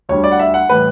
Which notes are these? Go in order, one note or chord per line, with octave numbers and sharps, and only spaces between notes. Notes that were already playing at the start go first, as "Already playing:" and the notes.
D2 D3 G3 C#5
D5
F#5
E5
F#5
A2 E3 G3 B4